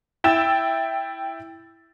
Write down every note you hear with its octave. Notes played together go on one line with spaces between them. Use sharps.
E4 G5 E6 A6 E7